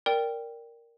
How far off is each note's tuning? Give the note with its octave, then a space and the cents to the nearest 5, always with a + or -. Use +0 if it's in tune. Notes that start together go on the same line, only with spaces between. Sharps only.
A#4 +0 D5 +0 G5 +0